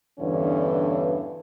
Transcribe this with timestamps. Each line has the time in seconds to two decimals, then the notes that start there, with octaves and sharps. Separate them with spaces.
0.20 E2 G2 D3 E3 C#4